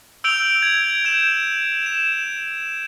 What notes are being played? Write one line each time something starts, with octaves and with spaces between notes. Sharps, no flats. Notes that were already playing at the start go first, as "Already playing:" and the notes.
E6 G6 D7 F7 G7
G#6
G6 E7
E7